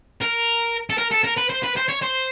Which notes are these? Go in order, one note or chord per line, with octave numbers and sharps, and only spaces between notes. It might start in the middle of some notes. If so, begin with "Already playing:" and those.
A#4
A4
A#4
A4
A#4
B4
C5
B4
C5
C#5
C5